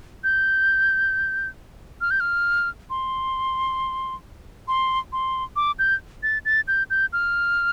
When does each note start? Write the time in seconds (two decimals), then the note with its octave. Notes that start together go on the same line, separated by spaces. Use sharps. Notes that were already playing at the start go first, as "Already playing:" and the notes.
0.24 G6
2.01 F6
2.11 G6
2.20 F6
2.90 C6
4.68 C6
5.12 C6
5.56 D6
5.79 G6
6.23 A6
6.45 A6
6.68 G6
6.90 G6
7.13 F6